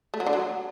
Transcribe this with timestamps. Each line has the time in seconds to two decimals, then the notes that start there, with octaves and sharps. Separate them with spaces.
0.14 A3
0.20 F#3
0.26 D3
0.33 F#3